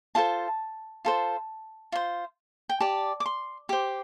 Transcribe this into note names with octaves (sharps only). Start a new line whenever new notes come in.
F4 A4 C5 A5
F4 A4 C5
F4 C5
G5
G4 D5 A5
D6
C6
G4 C5 D6